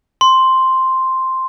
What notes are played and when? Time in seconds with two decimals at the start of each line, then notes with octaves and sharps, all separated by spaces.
0.21 C6